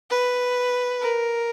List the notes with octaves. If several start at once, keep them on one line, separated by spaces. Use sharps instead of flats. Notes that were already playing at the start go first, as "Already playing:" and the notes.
B4
A#4